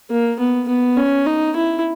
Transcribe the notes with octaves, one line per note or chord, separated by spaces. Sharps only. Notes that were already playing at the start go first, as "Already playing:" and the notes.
A#3
B3
B3
C#4
D#4
E4